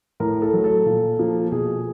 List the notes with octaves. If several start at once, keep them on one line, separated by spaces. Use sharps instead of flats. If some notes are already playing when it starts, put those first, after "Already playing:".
A2 A#4
A4
F#3 A3
A4
A#2
F3 A#3
B2 G#4